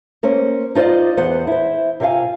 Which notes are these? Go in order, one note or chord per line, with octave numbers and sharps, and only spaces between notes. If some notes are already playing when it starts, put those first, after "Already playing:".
A#3 C#4 C5
D#4 F4 C5 D5 D#5
E2 B3 C5 F#5
E4 C5
C3 F4 C#5 F5 G#5